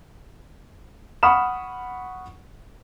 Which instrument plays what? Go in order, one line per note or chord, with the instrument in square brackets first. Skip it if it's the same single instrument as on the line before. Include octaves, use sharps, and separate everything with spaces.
[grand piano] F#5 B5 C#6 D#6 F6 E7